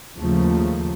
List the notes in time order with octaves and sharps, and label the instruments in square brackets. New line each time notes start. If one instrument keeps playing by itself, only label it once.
[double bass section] D#2 C#3 F3 A3